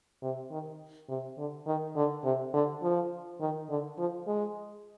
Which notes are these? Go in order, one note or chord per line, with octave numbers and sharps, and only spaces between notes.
C3
D#3
C3
D3
D#3
D3
C3
D3
F3
D#3
D3
F3
G#3